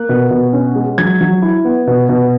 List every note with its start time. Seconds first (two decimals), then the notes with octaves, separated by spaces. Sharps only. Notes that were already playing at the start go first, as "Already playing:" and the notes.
Already playing: A#3 F#6
0.09 B2
0.30 B2
0.53 C#4
0.76 G#3
0.98 F#3 G#6
1.21 F#3
1.42 E4
1.65 B3
1.87 B2
2.09 B2